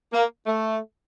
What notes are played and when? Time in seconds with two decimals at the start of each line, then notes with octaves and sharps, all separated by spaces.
0.13 A#3
0.46 A3